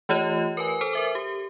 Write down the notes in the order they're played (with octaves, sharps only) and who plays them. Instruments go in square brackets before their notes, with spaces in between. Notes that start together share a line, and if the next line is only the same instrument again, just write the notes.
[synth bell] E3 A3 F4 G4 C#5 D#5
A#4 B4 G#5
A4 C5 G#5
A#4 E5 D6
G4